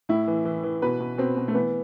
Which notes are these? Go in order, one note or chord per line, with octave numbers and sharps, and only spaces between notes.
A2 E4
E3
E3
E3
B2 B4
B2
B2 C4
B2
A3
E3 B3